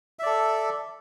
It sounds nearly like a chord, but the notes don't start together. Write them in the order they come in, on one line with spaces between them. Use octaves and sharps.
E5 D5 A4